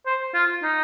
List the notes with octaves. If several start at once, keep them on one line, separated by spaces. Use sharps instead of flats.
C5
F4
D#4